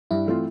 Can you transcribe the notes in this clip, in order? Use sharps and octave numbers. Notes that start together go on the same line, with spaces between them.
G2 E4
E3 A3 C4 F4